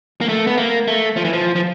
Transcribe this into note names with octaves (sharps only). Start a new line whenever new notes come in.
A#3
A3
B3
A#3
A3
F3
E3
F3
F3